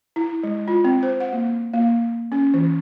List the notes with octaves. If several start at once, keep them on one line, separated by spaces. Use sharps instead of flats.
E4
G#3
F4
C4
C5
F#5
A#3
A#3
C#4
E3